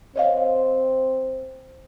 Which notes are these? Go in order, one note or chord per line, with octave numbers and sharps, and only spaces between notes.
C4 C#5 D#5 F5